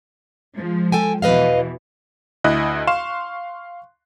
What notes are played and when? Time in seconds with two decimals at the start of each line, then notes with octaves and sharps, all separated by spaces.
0.56 F3 G#3
0.92 A4 G5 G#5
1.22 E2 B2 E3 B4 D#5 F5
2.44 D2 E4 D#5 F#6
2.87 F5 C6 C#6 E7